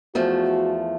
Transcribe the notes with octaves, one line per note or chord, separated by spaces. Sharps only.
E2 F3 A3 F#4